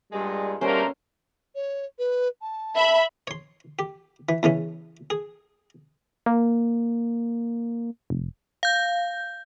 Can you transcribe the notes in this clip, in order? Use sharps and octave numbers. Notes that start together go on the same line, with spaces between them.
G2 A#2 G3 G#3
B2 D3 G3 A3 A#3 C#4 A#4 C5
C#5
B4
A5
E5 B5
C#5 C6
G4
E3
E2 C#3 E3 C#4
G#4
A#3
F1
F5 G6